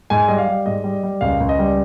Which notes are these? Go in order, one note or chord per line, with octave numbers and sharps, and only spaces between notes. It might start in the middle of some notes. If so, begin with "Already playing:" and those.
G#2 G#5
G3 D#5
F5
G3
G#2 D#5
G3
G3
C#2 F5
C#2
D#5
G3